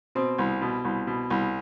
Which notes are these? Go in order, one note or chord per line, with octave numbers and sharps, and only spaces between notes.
B2 C4
C2
B2
C2
B2
C2